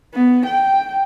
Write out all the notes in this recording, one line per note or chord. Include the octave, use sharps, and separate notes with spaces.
B3
G5